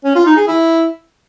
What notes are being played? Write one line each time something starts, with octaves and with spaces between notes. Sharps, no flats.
C#4
F4
D#4
G#4
E4